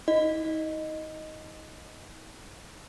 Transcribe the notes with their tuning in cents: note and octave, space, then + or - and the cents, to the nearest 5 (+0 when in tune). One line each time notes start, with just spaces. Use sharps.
D#4 +40 D#5 +0